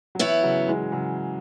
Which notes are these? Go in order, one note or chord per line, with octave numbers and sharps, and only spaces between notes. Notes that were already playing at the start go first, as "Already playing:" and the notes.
F#3
E3 B3 E4 C#5
C#3 F#3
E3 G#3
C#3 F#3